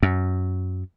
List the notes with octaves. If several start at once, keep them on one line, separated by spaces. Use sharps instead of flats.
F#2